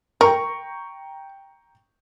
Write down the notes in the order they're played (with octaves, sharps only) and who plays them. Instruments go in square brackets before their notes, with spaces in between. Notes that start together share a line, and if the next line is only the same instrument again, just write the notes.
[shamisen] A#4 [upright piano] G5 A#5 C#6